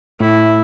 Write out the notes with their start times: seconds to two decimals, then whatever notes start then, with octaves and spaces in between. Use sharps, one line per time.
0.20 A2 E4